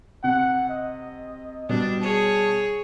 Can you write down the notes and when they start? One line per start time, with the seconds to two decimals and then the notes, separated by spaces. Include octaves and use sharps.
0.24 C3 F#5
0.69 D#5
1.69 B2 G3 B3 D4
2.01 G#4 C#5 A5